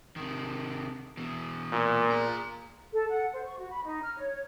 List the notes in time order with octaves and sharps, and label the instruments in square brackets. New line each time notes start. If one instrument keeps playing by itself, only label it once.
[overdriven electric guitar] C3 D#3
B2 E3
[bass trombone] A#2
[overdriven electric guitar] G#4 A#5
[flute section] A4
F#5
C5
C#6
F#4
B5
D#4
F6
C#5